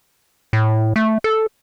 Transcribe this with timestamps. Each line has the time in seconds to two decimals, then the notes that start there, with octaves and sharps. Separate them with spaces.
0.53 A2
0.96 A3
1.24 A4